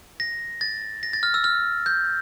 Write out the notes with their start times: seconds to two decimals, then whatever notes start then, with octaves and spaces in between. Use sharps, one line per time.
0.20 A#6
0.61 A6
1.03 A#6
1.13 A6
1.23 F6
1.34 E6
1.44 F6
1.86 G6